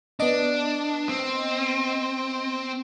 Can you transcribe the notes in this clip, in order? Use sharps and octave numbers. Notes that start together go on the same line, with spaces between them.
B3 D4 D#5
C4